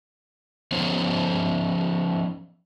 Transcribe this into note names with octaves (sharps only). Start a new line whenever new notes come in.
F3 B3 C#4 D#4 C5 C#5